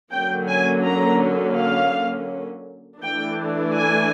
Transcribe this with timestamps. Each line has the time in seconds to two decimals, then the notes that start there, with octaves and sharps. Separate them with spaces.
0.13 D3 F#3 A#3 C#4 G5
0.49 G#5
0.85 A#5
1.57 F5
3.02 E3 A3 D4 G5
3.75 G#5